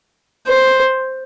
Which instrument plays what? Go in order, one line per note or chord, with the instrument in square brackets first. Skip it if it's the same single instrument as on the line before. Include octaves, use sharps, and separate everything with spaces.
[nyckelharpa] C5